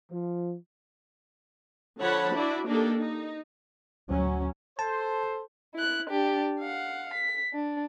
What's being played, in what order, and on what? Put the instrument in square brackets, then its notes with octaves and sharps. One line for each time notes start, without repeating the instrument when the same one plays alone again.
[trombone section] F3
[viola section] D3 F3 C#5 F#5 A5 B5
D4 E4 F#4 D5
A#3 D4 D#4 G4 A4
D#4
[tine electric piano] D2 [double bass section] F#3 C#4
[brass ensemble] A4 C5 [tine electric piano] A5
[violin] E4 F#6
D4 G4
F5 F#5
B6
D4